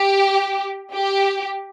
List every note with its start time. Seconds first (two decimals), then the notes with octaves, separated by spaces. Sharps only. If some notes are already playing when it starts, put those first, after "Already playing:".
Already playing: G4
0.94 G4